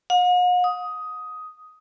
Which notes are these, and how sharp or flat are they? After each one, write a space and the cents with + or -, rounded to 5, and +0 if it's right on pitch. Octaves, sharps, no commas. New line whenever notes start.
F#5 -45
D#6 +10